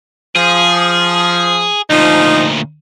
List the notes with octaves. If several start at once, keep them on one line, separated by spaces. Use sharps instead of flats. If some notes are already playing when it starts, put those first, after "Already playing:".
F3 G#4
D2 A#2 F3 D#4